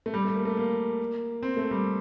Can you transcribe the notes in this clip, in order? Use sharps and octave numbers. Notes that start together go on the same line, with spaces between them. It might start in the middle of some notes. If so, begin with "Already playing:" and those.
A3
G3
A3
A#3
A3
A#3
C4
A3
G3